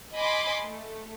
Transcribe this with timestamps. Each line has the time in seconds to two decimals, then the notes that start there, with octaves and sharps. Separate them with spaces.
0.15 D#5 G#5 B5 C6 D6
0.63 A3